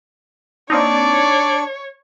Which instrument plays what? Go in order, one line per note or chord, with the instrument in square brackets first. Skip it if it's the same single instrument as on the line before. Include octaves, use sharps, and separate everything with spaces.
[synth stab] A#3 C4 D#4 [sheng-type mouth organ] D4 [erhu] C#5 [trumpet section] D5